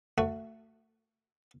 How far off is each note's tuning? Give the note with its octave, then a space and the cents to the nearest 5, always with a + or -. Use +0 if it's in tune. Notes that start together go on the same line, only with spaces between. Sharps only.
A3 +25 F#4 +0